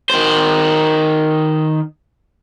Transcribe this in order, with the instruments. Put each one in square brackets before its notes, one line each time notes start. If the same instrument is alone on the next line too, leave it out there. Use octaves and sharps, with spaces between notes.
[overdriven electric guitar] D#3 C5